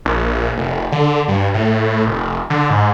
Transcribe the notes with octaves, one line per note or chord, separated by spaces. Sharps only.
A#1
F1
D3
G2
A2
F1
D3
G#2